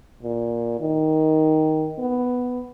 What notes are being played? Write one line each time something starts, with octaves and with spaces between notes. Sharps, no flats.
A#2
D#3
B3